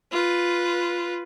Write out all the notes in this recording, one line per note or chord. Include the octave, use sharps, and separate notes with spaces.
F4 B4